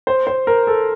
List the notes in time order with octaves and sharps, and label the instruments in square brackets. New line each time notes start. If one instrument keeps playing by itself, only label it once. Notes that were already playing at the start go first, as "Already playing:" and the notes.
[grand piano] C5
C5
A#4
A4